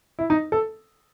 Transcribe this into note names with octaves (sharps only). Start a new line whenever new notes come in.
E4
D#4
A4